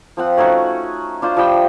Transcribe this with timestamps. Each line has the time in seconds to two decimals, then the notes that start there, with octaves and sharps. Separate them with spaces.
0.17 F3 C4 F#5
0.37 A3 C#4 D#4 F#4
1.22 D4 F4 C5
1.37 F3 G3 E5 G5